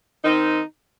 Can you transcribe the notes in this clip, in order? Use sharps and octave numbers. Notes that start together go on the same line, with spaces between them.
D#3 C4 D#4